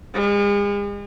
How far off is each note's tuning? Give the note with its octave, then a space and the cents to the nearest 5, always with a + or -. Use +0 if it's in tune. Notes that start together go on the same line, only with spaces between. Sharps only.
G#3 -40